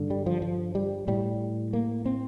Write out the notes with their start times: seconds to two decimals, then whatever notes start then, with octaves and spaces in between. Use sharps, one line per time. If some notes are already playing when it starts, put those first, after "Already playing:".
Already playing: G2 D3
0.10 G3
0.26 F3
0.42 F3
0.75 G3
1.08 A2 G3
1.73 A#3
2.06 C4